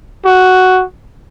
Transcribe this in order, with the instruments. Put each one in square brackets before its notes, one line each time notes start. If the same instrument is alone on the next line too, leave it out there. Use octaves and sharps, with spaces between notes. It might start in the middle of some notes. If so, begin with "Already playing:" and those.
[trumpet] F#4